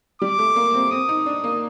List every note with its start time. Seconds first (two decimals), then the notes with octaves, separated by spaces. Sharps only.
0.22 G3 D6
0.39 A3
0.56 A#3
0.74 C4
0.91 C4 D#6
1.09 D#4
1.26 D4
1.44 A#3